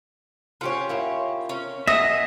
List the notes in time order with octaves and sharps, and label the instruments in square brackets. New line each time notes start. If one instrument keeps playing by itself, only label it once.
[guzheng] C#4 F#5 [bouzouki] F4 G4 C#5
[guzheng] A#3 E4 A#4
[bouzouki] C#4 [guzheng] A#5
[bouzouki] G#4 [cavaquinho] D#5 [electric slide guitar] E5 [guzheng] F#5 A#5